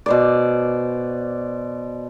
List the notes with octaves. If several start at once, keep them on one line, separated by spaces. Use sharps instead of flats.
B2 C5 D5